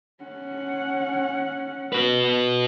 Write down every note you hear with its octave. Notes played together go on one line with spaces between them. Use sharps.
C#4 F#5
F#4 B4